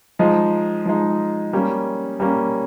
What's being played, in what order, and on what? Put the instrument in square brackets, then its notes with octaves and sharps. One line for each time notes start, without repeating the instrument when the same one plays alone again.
[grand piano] F3 G#3 D#4
F3 G#3 D#4
G3 A#3 C#4
G3 A#3 C#4